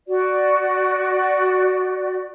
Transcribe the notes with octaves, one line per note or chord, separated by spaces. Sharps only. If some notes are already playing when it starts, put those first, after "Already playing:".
F#4 D5